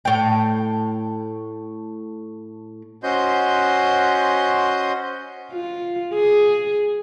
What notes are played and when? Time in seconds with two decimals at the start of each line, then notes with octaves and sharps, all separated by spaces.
0.05 A2 G5
3.03 C#4 F#4 C5 D#5 C6 G6
5.52 F4
6.14 G#4